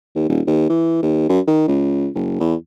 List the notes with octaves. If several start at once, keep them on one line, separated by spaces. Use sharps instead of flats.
D#2
D#1
D#2
E3
D#2
F#2
D#3
C#2
F#1
E2